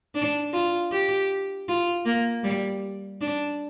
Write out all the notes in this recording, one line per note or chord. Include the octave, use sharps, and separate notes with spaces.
D4
F4
G4
F4
A#3
G3
D4